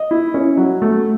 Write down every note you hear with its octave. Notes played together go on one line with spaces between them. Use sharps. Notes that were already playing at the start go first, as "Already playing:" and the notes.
Already playing: D#5
E4
C#4
F#3
A3